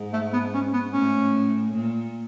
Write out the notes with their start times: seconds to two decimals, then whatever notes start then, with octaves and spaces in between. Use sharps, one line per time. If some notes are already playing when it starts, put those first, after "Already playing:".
Already playing: G#2
0.13 A3
0.33 B3
0.54 C#4
0.73 B3
0.93 A2 C#4
1.73 A#2